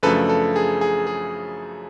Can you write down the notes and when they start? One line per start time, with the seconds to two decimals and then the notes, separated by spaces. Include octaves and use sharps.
0.03 F#2 C#3 F3 A3 D4 A4 B4
0.29 A4
0.56 G#4
0.81 G#4
1.07 G#4